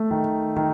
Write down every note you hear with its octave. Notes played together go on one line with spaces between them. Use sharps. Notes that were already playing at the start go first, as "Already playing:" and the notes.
Already playing: A3
D#3
D#3